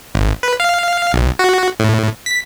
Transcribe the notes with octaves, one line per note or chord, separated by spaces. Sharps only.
G#1
B4
F5
B1
F#4
A2
B6